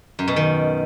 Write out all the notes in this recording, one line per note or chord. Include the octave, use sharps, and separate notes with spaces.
F#2
B2
D#3